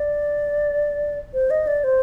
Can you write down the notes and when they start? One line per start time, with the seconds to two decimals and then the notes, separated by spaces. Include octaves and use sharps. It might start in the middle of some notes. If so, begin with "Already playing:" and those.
Already playing: D5
1.34 C5
1.50 D#5
1.67 D5
1.84 C5